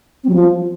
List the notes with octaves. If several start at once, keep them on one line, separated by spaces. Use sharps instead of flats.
C4
F#3
F3